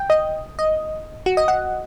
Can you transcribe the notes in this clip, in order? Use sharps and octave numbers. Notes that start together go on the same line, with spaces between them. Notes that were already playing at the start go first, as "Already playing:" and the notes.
Already playing: G5
D#5
D#5
F#4
D#5
F#5